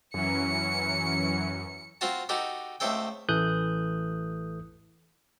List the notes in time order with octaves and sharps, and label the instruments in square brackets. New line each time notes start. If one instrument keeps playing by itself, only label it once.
[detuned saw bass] F#2 [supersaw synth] E3 F#3 C#4 [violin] C#7
[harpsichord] C4 F4 F#4 A5
D#4 F#4 G4 A4
C#2 A3 C4 A4 G5
[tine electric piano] A1 E3 A4 D#6 F#6 G6